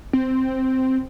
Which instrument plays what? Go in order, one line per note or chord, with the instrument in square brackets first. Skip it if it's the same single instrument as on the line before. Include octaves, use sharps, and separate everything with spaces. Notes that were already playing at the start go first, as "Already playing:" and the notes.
[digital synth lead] C4